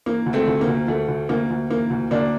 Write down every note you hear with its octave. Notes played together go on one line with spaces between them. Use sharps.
E3 A#3
D2
A3 C4
D2
A#3
D2
D2 A3
D2
D2 A#3
D2
E3 A#3
D2
D2 A#3 D4